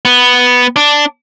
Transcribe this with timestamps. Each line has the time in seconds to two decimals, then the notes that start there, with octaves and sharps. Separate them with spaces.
0.05 B3
0.76 D4